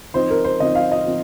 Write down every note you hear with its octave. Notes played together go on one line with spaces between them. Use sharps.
F3 C4 D#4 C5
A#4
C5
F3 C4 D#4 D#5
F5
D#5
F3 C4